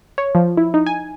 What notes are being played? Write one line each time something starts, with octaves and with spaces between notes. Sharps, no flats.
C#5
F3
E4
D#4
G#5